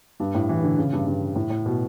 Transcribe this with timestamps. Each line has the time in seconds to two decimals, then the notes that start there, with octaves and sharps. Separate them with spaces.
0.20 G2
0.35 A2
0.49 E3
0.64 D3
0.78 C#3
0.93 G2
1.07 G2
1.35 A2
1.50 A2
1.66 B2